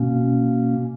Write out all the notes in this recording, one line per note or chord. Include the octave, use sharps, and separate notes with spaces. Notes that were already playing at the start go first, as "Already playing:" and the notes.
Already playing: B2 A#3 C#4